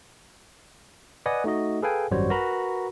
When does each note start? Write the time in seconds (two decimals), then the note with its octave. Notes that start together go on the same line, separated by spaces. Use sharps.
1.26 B4 D5 D#5 F#5 G#5 D#6
1.44 A3 D#4 F#4 D#5
1.82 G#4 A4 B4 F5 G5 G#5
2.11 G#1 F#2 G3 F#4 C5 C#5
2.30 F#4 A#4 B4 A#5 B5